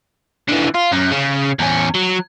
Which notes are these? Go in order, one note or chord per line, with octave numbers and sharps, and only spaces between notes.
D3 E3
F4
F#2
C#3
E2 C#4
F#3